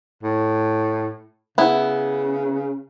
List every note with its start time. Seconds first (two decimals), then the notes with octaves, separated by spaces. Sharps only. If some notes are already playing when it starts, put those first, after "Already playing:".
0.23 A2
1.58 C#3 B3 E4